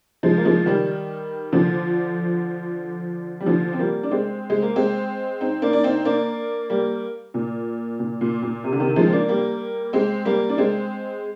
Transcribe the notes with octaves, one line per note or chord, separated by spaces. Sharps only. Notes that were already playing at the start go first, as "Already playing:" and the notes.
F3 G#3
A#3
F3 G#3
D#3 G3
D3 F3
G3
D3 F3
C4
G3 A#3
D4
G#3 C4
G#3
A#3
G#3 C4
C4 D#4
A#3 D4
D4
C4 D#4
A#3 D4
G3 A#3
A#2
A#2
A#2
A#2
C3
D3
C3 D#3
F3 G#3
C4
A#3 D4
G3 A#3
G#3 C4
G3 A#3
D4
G#3 C4